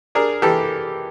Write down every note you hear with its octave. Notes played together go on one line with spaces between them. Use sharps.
D4 G#4 A#4
E3 G4 A4